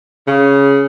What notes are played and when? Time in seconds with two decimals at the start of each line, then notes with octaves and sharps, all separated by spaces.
0.28 C#3